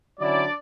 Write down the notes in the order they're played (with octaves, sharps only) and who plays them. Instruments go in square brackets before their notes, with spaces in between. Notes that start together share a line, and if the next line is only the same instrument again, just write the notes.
[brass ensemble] D3 F#3 C#4 D4 E4 D5